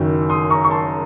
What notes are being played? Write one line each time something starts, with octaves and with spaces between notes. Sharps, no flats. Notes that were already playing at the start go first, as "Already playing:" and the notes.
Already playing: F#1 F#2 D#3 F#3
C6 D#6
A#5 C#6
C#6
A5 C6